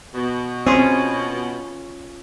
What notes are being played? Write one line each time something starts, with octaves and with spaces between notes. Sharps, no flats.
B2
C4 C#4 F4 G#4